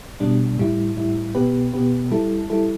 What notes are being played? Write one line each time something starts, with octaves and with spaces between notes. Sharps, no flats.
B2 G3 D4
A2 G3 E4
A2 G3 E4
B2 B3 G4 B4
B2 B3 G4 B4
G3 E4 A4
G3 E4 A4